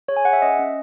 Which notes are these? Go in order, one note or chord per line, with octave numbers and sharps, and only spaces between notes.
G#4 C#5
G#5
G#4 F#5
E5
C#4 D#5
C#4